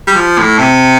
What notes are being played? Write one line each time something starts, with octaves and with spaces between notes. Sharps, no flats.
G3
F3
A2
C3